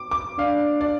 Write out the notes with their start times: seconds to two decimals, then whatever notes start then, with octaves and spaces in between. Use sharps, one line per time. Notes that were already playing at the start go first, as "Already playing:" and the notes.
Already playing: D6
0.11 D6
0.39 D4 F5
0.81 D5